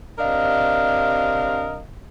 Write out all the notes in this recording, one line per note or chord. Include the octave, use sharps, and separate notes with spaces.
C3 D4 A#4 D#5 F5